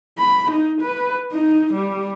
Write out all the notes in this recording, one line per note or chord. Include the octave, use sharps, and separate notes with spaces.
B5
D#4
B4
D#4
G3